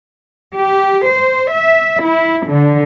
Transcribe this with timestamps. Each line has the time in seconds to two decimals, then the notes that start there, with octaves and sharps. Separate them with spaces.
0.56 G4
1.08 C5
1.53 E5
2.04 E4
2.48 D3